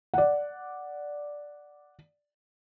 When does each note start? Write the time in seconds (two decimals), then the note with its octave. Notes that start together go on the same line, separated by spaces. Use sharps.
0.14 D5 F#5